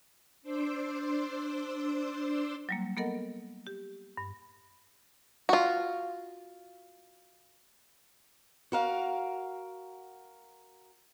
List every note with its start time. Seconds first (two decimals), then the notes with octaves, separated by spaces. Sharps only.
0.42 D4 C5 C6 D6 E6
2.69 F#3 G3 A#3
2.97 A#3 B3 A4 A#4 D#5 F#5
3.67 G4
4.17 G2
5.49 F4 F#4
8.72 F#4 A#4 F5